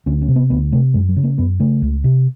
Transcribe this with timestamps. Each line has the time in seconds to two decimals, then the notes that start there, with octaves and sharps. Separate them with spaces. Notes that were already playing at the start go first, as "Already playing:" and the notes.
0.06 D2 C#4
0.22 C#4
0.28 C3
0.36 B3
0.50 D2 B3
0.72 C3 A3
0.94 F#2 G#3
1.09 F#3
1.16 C#3
1.24 A#3
1.38 F#2 B3
1.60 C#3 A3
1.82 C#2
2.04 C3